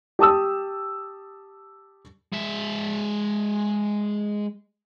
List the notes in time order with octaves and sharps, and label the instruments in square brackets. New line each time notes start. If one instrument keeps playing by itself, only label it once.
[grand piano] G4 A5 D#6 E6
[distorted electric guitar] G#3 E5